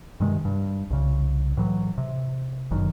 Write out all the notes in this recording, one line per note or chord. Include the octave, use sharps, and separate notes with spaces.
G2 C3 D#3 G#3
G2
C2 C#3
A2 E3 F#3
C3
G1 F#2 D#3